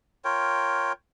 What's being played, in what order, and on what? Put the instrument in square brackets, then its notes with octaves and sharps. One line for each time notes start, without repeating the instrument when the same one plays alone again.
[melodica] F4 A#4 C#5 G5